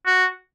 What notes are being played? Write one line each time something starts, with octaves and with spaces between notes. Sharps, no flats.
F#4